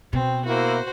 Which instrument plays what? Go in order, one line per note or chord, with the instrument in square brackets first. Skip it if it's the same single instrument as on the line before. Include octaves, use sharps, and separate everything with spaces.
[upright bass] B2 [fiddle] C4
[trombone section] A#3 E4 [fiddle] F#4 C5